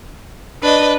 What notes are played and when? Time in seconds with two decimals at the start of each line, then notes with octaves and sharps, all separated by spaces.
0.63 D4 B4 D#5